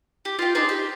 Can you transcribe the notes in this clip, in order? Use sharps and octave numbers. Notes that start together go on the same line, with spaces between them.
G4
F4 G5
D4 D#4 G#4 C5
G4